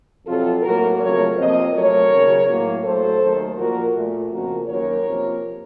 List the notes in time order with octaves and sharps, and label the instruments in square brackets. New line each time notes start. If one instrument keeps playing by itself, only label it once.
[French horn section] F2 C3 F#3 F4 A4
A2 F#3 A#3 F#4 A#4
F2 C#3 F#3 A3 A#4 C#5
F2 C3 F3 A#3 C5 D#5
C3 F#3 A3 A#4 C#5
D#2 C#3 F#3
A2 F#3 A#3
A2 F#3 A3 A4 C5
D#2 D#3 F#3 A3
A#2 F3 A#3 F#4 A#4
A#2 A3
F2 C#3 F3 A#3 F#4 A#4
F#2 D#3 A#3 A#4 C#5
C3 F3 A#3